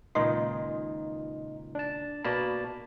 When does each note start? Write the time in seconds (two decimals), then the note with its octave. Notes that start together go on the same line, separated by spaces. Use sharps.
0.15 C#2 A#2 D#3 D#4 D#5 C6
1.75 D4 A5
2.25 B2 A#3 D5 A5 B5